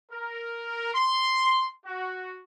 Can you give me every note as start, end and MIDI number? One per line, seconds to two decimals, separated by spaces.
0.11 0.92 70
0.94 1.67 84
1.85 2.41 66